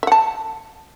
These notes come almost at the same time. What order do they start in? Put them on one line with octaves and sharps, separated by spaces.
E5 F#5 A5